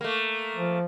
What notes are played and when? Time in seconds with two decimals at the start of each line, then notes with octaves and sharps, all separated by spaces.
0.01 A3 A#3
0.56 F3